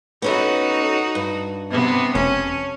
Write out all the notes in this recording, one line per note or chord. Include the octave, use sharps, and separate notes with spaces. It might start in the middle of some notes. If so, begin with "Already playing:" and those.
B3 C#4 D#4 F#4 A4
G2
C3 B3
F1 C#4 A5